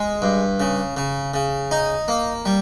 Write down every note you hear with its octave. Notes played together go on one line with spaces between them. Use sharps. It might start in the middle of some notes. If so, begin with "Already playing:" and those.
Already playing: G#3
G2
C#3
C#3
C#3
D#4
A#3
G3